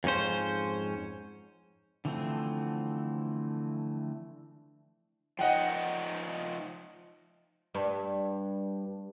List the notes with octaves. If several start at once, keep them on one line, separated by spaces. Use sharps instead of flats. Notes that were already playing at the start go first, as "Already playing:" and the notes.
F2 G#2 C#4 C5
D3 E3 F3 A3 C4
F3 D#4 D#5 F#5 G5
G2